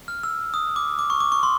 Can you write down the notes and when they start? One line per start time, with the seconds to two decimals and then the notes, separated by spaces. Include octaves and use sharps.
0.08 F6
0.23 E6
0.54 D#6
0.76 D6
0.99 D6
1.10 C#6
1.20 D6
1.32 C#6
1.43 C6